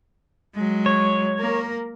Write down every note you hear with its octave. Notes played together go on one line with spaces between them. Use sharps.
F#3 G#3
C#5
A#3 A#4